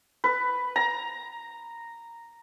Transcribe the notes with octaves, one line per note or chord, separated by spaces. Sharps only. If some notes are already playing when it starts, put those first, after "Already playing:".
B4
A#5